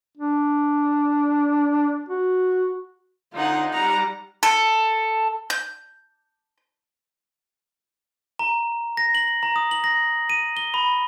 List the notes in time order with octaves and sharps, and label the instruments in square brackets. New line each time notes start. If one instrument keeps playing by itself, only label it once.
[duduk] D4
F#4
[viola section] D3 D#4 C5 [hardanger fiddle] F4 F#5
[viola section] G3 F#5 [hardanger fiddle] A#5
[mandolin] A4
G6
[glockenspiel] A#5
A#6
F#7
A#5
D#6
F#7
A#6
D#7
G7
B5